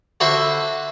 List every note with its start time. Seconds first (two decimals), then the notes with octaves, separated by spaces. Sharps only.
0.20 D3 F#4 A4 C5 E5 B5